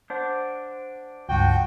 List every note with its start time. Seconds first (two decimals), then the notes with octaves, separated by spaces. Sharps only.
0.10 D4 C5 F#5
1.29 C#2 G2 F3 F#4 G5